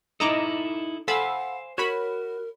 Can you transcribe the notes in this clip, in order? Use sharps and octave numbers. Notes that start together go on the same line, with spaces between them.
D#4 E4 A4 D#5 A#5 D6
A4 C5 F5 F#5 G#5 B5 E6
F#4 A#4 C#5 B5